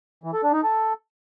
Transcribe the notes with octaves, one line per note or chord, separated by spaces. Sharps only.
E3
A4
D4
D#4
A4